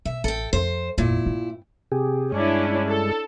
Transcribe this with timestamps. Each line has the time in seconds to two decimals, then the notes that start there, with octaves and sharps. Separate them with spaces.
0.05 B2 E5
0.24 A1 A4 G5
0.53 F2 C5
0.98 G#1 F2 A#2 E4
1.26 G2 C4
1.92 C3 G4 G#4
2.32 G2 G#3 C#4 D4 E4
2.88 A4